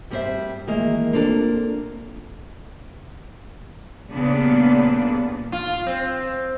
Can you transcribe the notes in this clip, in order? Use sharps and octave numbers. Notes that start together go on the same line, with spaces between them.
G2 G3 C4 D#4 C5 E5
D#3 E3 G#3 A#3
A#3 C4 D4 F4 A4
A#2 C#3 G3 B3 D4
F4
C4